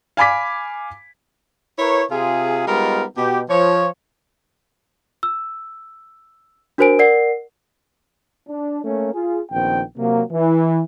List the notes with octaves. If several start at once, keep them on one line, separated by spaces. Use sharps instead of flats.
F5 G#5 B5 D6 B6
E4 A#4 B4 C#5
C3 F4 G#4
G3 G#3 B3 D#4 F4 A#4
B2 G4
F3 C#5
E6
D4 F#4 A#4 C5 G#5 D7
A#4 D5 F#5 C7
D4
A3 A#3 C#4
F4 G#4
A#1 D#3 B3 C4 G5
C3 F#3 A#3
E3